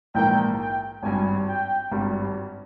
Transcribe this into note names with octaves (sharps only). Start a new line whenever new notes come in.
A#1 G#2 E3 A#3 G5
G5
G#1 G2 G3 G#5
G5
G#1 G2 G3